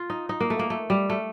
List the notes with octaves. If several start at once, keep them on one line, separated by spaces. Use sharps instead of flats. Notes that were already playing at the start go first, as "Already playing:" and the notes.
Already playing: F4
D#4
D#4
A#3
A3
A#3
A3
G3
A3